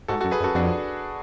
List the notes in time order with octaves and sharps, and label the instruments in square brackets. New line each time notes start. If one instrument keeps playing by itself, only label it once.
[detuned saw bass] G#2 [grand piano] F#4 A4
[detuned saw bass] F#2 [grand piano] F#4 A4
[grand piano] G#4 B4
[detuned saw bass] F#2
[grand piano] F#4 A4
[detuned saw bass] F2 [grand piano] D4 F#4